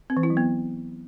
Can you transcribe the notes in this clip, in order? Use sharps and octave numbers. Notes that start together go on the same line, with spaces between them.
C4
E3
E4
F#3
B3